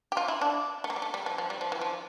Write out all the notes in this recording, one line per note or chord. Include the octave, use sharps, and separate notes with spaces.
G4
F4
E4
D4
A3
A#3
G3
A3
G3
F3
F3
G3
F3
E3
F3